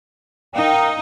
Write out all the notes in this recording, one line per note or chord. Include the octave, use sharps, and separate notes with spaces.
D#4 A#4 F5 G5